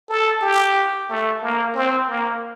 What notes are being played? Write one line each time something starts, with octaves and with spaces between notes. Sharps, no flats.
A4
G4
A3
A#3
C4
A#3